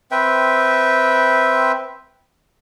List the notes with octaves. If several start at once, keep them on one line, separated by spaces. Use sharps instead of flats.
C4 B4 E5 G5